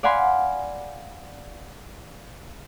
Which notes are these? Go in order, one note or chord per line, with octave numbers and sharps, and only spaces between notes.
D5 F5 F#5 G#5 B5 C6